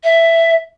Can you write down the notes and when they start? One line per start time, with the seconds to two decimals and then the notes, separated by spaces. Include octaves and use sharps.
0.04 E5